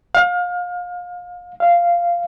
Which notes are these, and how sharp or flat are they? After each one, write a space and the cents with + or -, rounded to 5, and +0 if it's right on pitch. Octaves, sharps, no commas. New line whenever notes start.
F5 +30
F5 -10